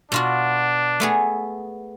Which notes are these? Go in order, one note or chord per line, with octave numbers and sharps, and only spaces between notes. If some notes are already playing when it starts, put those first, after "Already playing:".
B2 D4 F4 F#4
A3 B3 G#4